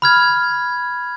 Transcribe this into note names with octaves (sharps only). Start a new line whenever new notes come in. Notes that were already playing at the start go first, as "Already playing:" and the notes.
B5 F6 G#6